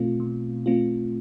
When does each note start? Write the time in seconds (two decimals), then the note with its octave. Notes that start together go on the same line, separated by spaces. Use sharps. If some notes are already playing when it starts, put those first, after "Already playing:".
Already playing: B2 A3 C4 F4
0.20 B2
0.66 A3 C4 F4